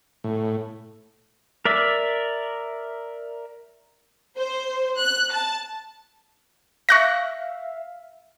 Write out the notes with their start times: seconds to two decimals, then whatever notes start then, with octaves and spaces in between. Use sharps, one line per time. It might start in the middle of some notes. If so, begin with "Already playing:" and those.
0.24 A2
1.65 A#4 D5 E5
4.37 C5
4.99 F#6
5.33 A5
6.89 E5 F5 C#6 F#6 A#6